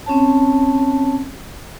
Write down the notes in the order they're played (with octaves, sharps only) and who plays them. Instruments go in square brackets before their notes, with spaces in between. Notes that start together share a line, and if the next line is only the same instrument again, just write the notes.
[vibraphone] C4 C#4 C#5 A5